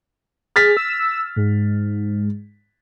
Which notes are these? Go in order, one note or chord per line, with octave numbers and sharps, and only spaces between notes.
G#4 F6 A6 B6
E6
G#2